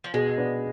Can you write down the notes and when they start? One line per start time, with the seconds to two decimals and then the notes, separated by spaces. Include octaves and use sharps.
0.04 F3
0.14 B2 G#3
0.38 B3 D4